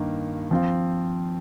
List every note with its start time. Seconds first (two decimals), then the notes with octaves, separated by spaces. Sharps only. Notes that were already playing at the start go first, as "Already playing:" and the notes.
Already playing: G2 D#3 A#3
0.51 F3 C4 F4